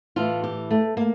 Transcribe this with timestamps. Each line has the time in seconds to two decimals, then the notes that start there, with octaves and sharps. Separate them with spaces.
0.16 A2 E3 F4
0.44 G4
0.71 A3
0.97 A#3